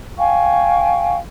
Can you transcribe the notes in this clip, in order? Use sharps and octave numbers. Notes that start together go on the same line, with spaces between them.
F5 G5 G#5 C#6